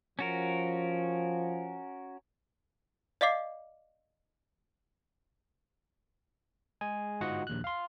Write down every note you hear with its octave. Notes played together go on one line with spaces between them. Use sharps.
F3 C#4 F#4 A#4
D5 D#5 F5 D6 C7
G#3 G#4 G#5
G1 G#2 F4 F#4 D#5 F#5
A#1 D#2 F#6
F5 C6